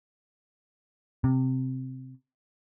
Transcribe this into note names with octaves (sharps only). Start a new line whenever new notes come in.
C3